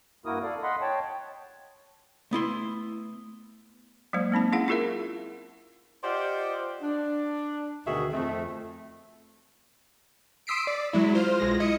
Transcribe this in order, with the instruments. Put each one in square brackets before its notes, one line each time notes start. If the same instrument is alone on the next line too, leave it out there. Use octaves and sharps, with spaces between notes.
[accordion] G2 A#3 E4 F#4 A#4 D#6
A4 D5 F5
D#5 F#5 B5 C6
C#5 G5 A5
[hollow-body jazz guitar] A3 B3 E4 C6
[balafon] F#3 G#3 A#3 C5
A#3 C4 D#4 A5
C#4 E4 G#4 F5 F#5
E4 F4 G#4 A#4 E5
[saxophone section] F4 G4 C5 D5 D#5 F#5
D4
D2 B2 D#3 F#4 G#4 E5
F2 A3 C4
[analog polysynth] C6 D#6 E6 B6 C7 D7
D5
F#3 G#3 E4
F4 C5 F6
B1 G#3 A#6
E4 D#5 D#6 C#7